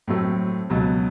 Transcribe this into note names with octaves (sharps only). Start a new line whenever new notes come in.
A2 F#3 A3 C4
C#2 B2 F#3